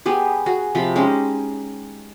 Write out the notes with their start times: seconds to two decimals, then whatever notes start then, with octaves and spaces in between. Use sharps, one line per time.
0.06 B3 G4 G#4
0.46 F#4 G#4
0.75 C3 F3 B5
0.96 G#3 C#4 D#4 G4